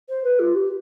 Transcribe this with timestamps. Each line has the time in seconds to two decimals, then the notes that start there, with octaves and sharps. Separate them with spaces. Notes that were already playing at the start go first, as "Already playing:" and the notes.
0.09 C5
0.24 B4
0.39 F4
0.55 G4